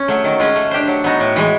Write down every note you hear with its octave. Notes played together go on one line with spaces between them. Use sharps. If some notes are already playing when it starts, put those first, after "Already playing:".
Already playing: C#4
F#3 A3
D#3
G#3 C#4 F4
A3
D4 G4 C5
F#3
B3 D#4 F#4
A2
E3 G#3